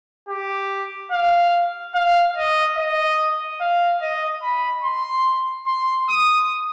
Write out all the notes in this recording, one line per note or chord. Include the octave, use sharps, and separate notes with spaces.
G4
F5
F5
D#5
D#5
F5
D#5
B5
C6
C6
D#6